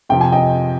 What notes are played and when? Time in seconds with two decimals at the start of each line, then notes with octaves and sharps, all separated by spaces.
0.09 F2 C3 F3 G5
0.21 G#5
0.32 D#5 G5